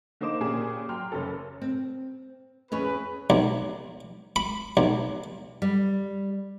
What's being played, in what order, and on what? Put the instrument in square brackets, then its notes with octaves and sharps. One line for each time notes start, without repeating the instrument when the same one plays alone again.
[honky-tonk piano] D3 A#3 D#4 C5 D6 E7
A#2 A#3 C#4 G4 G#4
F#3 G5 C6 F6
F#1 C#4 A4
[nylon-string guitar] C4
[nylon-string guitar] E2 C#4 C#5 [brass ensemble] G#4 B4
[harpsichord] B1
B5
B1
[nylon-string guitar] G3